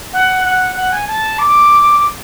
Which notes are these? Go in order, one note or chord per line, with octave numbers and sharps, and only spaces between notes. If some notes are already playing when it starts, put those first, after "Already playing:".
F#5
F#5
F#5
G#5
A5
D6